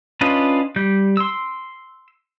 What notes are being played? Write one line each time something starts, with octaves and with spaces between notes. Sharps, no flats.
C#4 D4 F4 B4 D#5
G3 G6
C6 E6